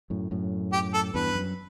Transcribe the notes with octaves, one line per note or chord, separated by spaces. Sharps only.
F#2 A2
F#2 A2
G4
A4
E2 G2 B4
F#2